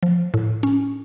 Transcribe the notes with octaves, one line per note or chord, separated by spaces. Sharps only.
F3
A2
C#4